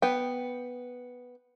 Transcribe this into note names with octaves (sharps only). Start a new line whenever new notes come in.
B3 G5